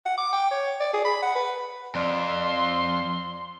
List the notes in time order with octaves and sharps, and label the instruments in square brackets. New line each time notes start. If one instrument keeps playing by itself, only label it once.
[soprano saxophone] F#5
D6
G5
C#5
D5
G#4
B5
F#5
B4
[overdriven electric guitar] F2 [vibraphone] D5 [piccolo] C6